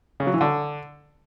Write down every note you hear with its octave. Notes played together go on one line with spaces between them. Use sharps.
C#3
F#3
E3
D3